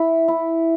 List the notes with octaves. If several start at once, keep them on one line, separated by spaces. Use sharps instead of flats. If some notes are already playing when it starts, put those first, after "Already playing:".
Already playing: E4
E4